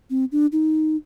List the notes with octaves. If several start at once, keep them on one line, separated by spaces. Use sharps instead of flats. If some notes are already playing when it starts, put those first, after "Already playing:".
C4
D4
D#4